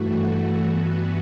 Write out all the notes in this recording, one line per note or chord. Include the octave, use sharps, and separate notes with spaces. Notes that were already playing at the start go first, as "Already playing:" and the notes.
Already playing: G2 E3 A3 F#4
F#4
G2 E3 B3 F#4